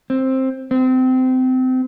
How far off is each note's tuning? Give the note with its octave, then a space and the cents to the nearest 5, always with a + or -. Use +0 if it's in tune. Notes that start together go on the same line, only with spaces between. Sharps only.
C4 +10
C4 -25